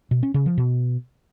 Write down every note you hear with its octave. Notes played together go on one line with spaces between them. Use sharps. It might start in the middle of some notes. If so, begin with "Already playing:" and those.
B2
C#4
C#3
F3
B2